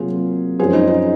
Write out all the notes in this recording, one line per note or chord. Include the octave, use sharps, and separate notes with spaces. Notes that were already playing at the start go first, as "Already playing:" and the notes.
Already playing: C3 F#3 A#3 F4 G#4
F#2 F3 G#3 G#4 C5
D#4
D#4